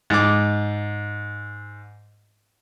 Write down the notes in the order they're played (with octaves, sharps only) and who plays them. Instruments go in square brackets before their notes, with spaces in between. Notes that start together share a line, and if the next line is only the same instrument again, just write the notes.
[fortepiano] G#2 D6